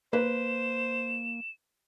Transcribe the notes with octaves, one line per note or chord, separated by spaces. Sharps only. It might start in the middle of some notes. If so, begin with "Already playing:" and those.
A#3 B4 C5 E7